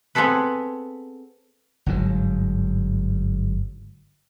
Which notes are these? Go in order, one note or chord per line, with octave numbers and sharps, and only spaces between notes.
B3 C4 G#4 A4 B4
G1 G#2 F#3